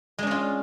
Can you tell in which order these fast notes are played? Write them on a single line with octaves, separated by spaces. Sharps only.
G#3 D4 C#4 F4